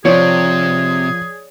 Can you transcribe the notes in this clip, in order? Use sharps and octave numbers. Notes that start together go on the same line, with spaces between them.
C3 F3 G#4 C#5 D5